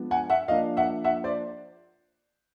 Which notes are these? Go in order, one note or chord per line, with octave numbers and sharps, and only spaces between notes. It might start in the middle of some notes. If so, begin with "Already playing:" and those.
Already playing: F3 G#3 B3 D4
F#5 G#5
E5 F#5
F3 A#3 D4 D#5 F5
E5 F#5
E5 F#5
C5 D5